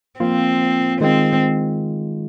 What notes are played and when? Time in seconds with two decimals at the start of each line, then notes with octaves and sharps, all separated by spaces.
0.20 F3 A#3 C4 F4
1.01 D#3 G#3 C4 F4